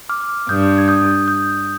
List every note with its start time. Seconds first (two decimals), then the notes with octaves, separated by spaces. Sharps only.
0.09 D6 F6
0.49 G2 D#6 G6
0.78 G#6
0.88 D#6 G6
1.28 D#6 G6